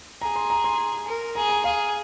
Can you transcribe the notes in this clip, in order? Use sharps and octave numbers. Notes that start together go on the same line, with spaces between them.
G#4 A#5
C6
A#5
C6
A#4
G#4 A#5
A#5
G#4 F5